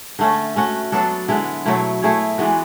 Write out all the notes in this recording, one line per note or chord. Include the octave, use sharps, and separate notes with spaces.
D3 A3 C#4
A3 C#4 F#4
F#3 B3 D4 A4
D3 G#3 B3 E4
B2 F#3 A3 E4
A3 E4 G#4 C#5
E3 G#3 B3 F#4